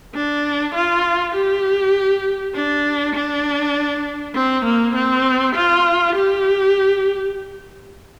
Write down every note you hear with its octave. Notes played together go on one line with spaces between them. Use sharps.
D4
F4
G4
D4
D4
C4
A#3
C4
F4
G4